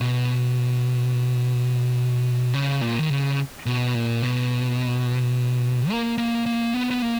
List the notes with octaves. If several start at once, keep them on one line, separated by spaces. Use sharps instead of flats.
B2
C#3
A#2
D#3
C#3
B2
A#2
B2
A#3
A#3
A#3
B3
B3
A#3